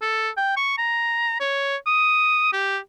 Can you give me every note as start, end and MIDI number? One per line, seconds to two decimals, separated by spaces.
0.02 0.29 69
0.37 0.55 79
0.56 0.75 85
0.78 1.37 82
1.40 1.76 73
1.86 2.53 87
2.53 2.78 67